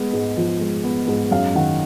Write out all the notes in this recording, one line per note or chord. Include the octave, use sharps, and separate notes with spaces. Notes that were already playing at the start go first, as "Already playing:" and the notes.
Already playing: G#3 B3
G#2
F3
G#3
B3
G#2
F#2 F5
D#3 F#5